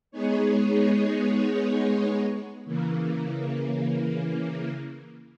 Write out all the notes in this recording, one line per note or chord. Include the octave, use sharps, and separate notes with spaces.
G#3 B3 D#4 G#4 C#5
C#3 E3 A#3